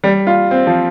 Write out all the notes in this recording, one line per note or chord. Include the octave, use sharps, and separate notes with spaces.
G3
F4
C4
F3